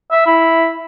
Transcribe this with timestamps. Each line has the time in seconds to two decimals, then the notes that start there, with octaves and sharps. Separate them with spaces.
0.11 E5
0.26 E4